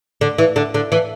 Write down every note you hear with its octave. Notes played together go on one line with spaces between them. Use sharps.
D3
E3
D3
D3
E3